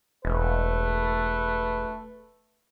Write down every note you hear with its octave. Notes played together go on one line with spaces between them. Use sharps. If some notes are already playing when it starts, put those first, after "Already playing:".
E1 A3 B4